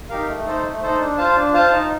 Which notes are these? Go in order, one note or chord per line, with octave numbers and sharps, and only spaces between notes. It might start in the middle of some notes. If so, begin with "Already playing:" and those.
D#4 G4 A#4 F5
A3
D#4 A4 C5
A3
D#4 A4 C5
D4
F4 C5 F5 A5
D4
F4 C5 F5 A5
D#4